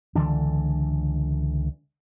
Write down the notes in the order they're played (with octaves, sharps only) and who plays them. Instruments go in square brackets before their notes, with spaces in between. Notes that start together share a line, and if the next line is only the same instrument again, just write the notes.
[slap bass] C#2 D3 E3 D4